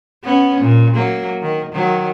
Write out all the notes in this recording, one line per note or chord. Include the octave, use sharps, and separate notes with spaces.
B3 C#4
A#2
F#3 A#3
D#3
D#3 F#3